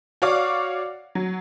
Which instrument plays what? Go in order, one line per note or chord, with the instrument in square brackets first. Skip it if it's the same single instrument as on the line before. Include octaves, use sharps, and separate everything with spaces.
[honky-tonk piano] F#4 C#5 D5 F5 D6
F#3